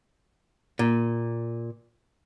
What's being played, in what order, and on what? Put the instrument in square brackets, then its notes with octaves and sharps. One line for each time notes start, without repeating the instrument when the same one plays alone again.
[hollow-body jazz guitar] A#2